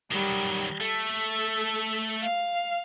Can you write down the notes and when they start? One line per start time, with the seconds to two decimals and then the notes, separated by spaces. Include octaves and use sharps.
0.12 D#3 F#3 G3
0.81 A3 A4
2.23 F5